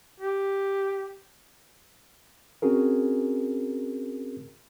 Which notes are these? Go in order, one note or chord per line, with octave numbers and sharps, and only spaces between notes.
G4
C4 C#4 F#4 G#4 A#4